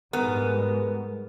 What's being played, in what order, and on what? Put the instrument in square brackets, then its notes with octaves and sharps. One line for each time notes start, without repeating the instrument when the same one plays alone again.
[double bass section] G#2 G3 G#3 [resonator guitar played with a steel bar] B3 [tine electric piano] A#4